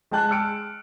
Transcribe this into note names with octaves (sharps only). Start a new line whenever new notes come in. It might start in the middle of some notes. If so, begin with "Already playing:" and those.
G#3 G5 A5 F#6
E6 F6 C#7 D7